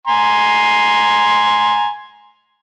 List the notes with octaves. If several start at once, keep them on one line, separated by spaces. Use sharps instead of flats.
G#5 A#5 C6